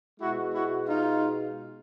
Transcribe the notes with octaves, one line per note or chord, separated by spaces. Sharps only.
B2 G#3 E4 F#4
E4 F#4
D#4 F4